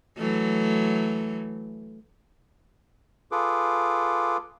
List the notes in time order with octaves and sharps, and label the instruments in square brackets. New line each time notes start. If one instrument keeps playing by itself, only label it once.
[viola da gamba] E3 F#3 A3
[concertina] F4 G#4 A4 B4 D6